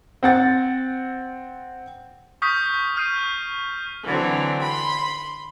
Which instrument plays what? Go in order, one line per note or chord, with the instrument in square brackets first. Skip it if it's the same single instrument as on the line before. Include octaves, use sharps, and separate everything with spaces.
[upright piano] C4 F#5 A6
[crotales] C#6 D#6 F6 G6 B6
D#6 F6 G6 C7 D#7
[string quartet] D3 E3 F#3 C4
B5 C6